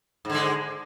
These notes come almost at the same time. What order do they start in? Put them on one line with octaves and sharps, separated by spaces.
G#2 D3 G#3